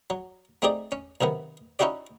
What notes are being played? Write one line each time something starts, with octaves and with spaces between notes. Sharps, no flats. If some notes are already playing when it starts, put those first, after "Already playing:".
F#3
A3 C4 D#4 G4 G#4 D5
C#4
B1 C3 D#3 B3
C#4 D#4 E4 F#4 G4 D5